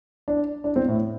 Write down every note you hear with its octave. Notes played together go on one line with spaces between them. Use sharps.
D4
D4
C4
A2